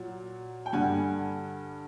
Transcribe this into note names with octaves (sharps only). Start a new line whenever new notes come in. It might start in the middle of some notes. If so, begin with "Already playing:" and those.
Already playing: A#2 F#3
G5
G2 D3 G3 F#5 G#5